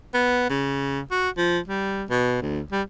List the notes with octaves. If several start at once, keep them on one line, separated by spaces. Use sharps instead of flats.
B3
C#3
F#4
F3
G3
B2
D2
G3